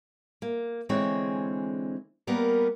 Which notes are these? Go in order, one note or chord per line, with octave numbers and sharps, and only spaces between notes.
A#3
D3 E3 G#3 C4 C#5
G3 A#3 B3 A#4